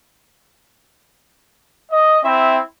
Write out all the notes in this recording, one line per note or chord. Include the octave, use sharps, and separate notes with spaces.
D#5
C4 E4 E5